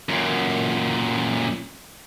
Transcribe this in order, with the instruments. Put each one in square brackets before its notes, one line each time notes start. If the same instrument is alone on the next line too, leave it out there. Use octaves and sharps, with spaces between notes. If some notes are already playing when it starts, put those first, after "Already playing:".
[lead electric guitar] F#2 A#2